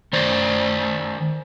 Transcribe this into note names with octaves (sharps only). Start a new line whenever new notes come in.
D#3 C5 D5